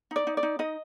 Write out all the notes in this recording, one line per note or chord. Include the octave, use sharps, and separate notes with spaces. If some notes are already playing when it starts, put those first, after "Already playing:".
D#4 D5
D#4
D5
D#4
D#4 D#5